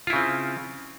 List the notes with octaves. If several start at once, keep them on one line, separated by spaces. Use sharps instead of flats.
C#3 C4 E4 F4